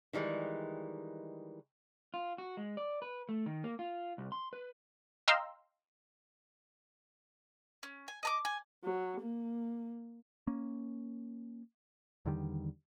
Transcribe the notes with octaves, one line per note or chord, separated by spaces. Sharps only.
D#3 E3 G3 G#3
F4
F#4
G#3
D5
B4
A3
D#3
A#3
F4
C2
C6
B4
D#5 F5 G5 A#5 C6 E6
C#4
G#5
D#5 A5 D6
G#5
F#3
A#3
A#3 C#4
E2 D3 D#3 G3